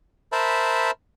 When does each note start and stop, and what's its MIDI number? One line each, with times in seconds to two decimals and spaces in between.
0.32 0.91 70
0.32 0.91 72
0.32 0.91 76
0.32 0.91 81
0.32 0.91 83